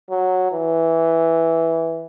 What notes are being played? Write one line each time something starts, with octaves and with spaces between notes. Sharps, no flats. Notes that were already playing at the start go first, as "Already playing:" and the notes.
F#3
E3